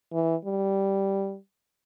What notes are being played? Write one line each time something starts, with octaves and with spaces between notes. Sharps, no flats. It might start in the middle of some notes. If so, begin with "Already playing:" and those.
E3
G3